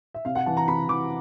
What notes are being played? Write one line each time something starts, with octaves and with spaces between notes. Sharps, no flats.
E5
C3 F5
F#5
E3 A5
A#5
C3 B5
E3 D6